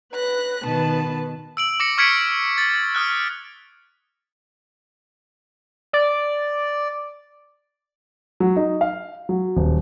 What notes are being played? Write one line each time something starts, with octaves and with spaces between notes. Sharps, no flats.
B4 F#6 A#6
B2 D#3 B3 B4 A5
E6 D7 F#7
D6 A#6 C#7
C#6 F6 G#6 B6 C#7 D7
A6
D#6 F6 F#6
D5
F#3
D#4
F5
F#3
D#1